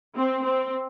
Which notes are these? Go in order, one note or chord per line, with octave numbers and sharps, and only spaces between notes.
C4
C4